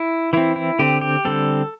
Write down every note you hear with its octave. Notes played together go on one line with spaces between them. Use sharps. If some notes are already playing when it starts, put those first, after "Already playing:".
Already playing: E4
E3 C4 E4
E4
D3 C4 G4
G4
D3 G3 C4 A4